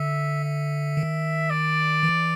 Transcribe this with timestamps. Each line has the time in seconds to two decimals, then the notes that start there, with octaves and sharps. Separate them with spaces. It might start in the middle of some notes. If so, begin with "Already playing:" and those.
Already playing: D3 E5
0.44 E5
0.97 D#3
1.50 D5
2.03 E3